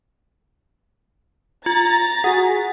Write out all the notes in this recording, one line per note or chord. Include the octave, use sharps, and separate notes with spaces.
F4 A#5 A6
F#4 G#4 F#5